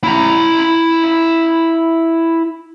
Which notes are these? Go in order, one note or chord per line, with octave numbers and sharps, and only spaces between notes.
E4 A#5